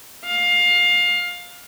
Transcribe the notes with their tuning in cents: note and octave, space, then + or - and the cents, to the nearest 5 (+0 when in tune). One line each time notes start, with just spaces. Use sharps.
F5 +20